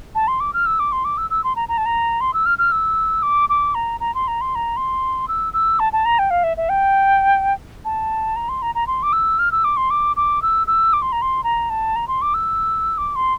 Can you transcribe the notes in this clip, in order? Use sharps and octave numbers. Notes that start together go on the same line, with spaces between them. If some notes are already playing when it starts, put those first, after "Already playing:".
A5
C6
D6
F6
E6
D6
C6
D6
E6
E6
C6
A#5
A#5
A5
A#5
C6
E6
F6
F6
E6
D6
D6
A#5
A#5
C6
A#5
C6
A#5
C6
E6
E6
A5
A5
A#5
G5
F5
E5
E5
G5
A5
A#5
C6
A#5
A#5
C6
D6
E6
F6
E6
D6
C6
D6
D6
E6
E6
D6
C6
A#5
C6
A#5
A5
A#5
C6
D6
E6
D6
C6